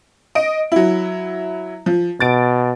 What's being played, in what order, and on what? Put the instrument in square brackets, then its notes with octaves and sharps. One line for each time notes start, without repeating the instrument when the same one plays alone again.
[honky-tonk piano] D#5 D7
F#3 E4
F3
[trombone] B2 [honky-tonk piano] A6 D7